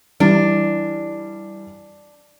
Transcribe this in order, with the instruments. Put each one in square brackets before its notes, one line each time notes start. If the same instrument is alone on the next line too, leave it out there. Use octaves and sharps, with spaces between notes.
[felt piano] E3 G3 [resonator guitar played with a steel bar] D4